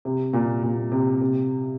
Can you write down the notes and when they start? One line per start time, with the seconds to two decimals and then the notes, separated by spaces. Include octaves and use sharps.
0.05 C3
0.33 A#2
0.63 A#2
0.92 C3
1.21 C3